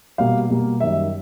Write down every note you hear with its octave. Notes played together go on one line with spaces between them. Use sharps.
B2 G3 A#3 F5
B2 G3 A#3
F#2 D#3 G3 E5